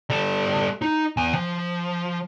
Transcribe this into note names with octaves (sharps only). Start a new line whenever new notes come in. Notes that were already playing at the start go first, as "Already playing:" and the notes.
G3 A4
D#4
E2 G#5
F3